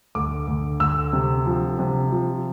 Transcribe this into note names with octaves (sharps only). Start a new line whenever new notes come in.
D2 D6
D2
D2 E6
C3
F3
C3
F3